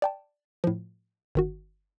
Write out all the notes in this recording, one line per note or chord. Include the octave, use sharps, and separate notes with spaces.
D5 G5 A5
A2 F3
G1 D#3 F#4